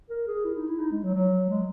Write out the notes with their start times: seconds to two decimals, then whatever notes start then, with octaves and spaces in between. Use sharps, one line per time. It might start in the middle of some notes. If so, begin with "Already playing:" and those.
0.10 A#4
0.27 G#4
0.45 E4
0.57 D#4
0.67 E4
0.80 D#4
0.91 G#3
1.03 F#3
1.15 F#3
1.49 G#3